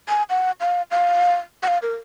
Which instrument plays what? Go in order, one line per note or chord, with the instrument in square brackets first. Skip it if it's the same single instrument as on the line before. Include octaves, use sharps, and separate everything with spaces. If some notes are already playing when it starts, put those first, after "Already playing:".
[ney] G#5
F#5
F5
F5
F#5
F5
A#4